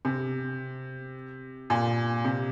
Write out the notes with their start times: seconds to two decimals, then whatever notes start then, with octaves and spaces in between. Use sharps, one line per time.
0.05 C3
1.70 A#2
2.25 C3